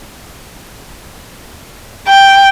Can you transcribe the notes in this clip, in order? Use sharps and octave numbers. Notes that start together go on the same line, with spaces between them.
G5